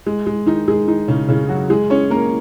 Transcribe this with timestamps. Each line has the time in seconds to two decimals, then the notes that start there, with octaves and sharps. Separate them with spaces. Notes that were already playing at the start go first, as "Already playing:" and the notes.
0.06 G#3
0.27 G#3
0.46 D#3 D#4
0.68 G#3 G#4
0.87 D#3 D#4
1.08 C#3 C#4
1.29 C#3 C#4
1.49 F#3 F#4
1.70 G#3 G#4
1.90 C#4 C#5
2.10 A#3 A#4